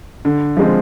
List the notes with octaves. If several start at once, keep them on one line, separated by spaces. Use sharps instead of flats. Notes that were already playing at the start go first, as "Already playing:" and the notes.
D3
F3 G#3 C4